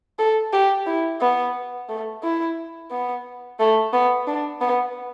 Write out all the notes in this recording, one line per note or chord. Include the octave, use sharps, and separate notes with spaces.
A4
G4
E4
B3
A3
E4
B3
A3
B3
D4
B3